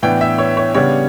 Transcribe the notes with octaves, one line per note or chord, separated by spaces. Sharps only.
A2 E3 B3 D4 G5
E5
C#5
C#5
C#3 G3 B3 D4 C#5